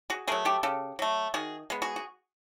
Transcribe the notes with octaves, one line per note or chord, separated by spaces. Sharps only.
F#4 G#4
F#3 A3 G#4 A#4
G4 A4
C#3 G4 A4
F#3 A3
D#3 F#4 G#4
G#3 B3
F#4 G#4
F#4